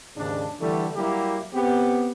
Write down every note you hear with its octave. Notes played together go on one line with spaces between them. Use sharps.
D#2 G#2 C#3 D4
D3 E3 G3 A3
F#3 G3 A#3 E4 G4
B3 C4 G4